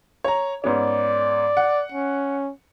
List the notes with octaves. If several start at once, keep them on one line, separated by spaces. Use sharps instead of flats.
C#5 A#5
G#2 B3 C#4 D5
F#5
C#4